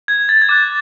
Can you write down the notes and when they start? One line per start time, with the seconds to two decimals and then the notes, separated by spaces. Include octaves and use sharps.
0.08 G#6
0.29 A6
0.42 G#6
0.49 D6 F#6 A6